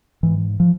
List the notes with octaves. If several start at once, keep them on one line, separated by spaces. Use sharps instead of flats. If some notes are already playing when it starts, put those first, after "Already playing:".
G#2 E3
F3